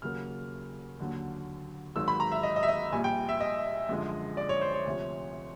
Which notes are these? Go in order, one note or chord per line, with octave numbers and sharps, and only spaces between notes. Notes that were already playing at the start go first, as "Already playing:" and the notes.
D#2 C#3 F#3 A#3 F6
D#2 D3 F#3
G#1 G#2 D#3 F#3 E6
B5
A#5
E5
D#5
D#5
E5
D#5
A#1 A#2 G3 G#5
G5
E5
D#5
F#2 D3 F3 G#3
D5
C#5
C5
C#5
D2 C3 F3